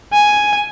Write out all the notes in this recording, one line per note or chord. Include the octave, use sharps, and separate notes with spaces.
G#5